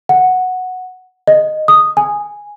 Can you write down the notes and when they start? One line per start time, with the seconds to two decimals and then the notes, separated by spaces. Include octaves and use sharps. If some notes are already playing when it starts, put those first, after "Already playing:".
0.09 F#5
1.27 D#5
1.68 D#6
1.97 G#5